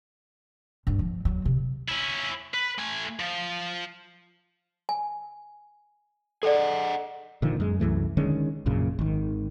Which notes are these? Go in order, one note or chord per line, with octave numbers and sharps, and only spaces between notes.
G2
F3
F#3
C3
C#4 E4
B4
A3 G#5
F3
G#5
G#4 A4 D5 D#5 F#5
A#2 D3 D#3 F3
F#2 G#3
C2 F#2 E3 A3
D3 D#3 G#3 C#4
A#1 F#2 A#2 C#3
G#1 D#3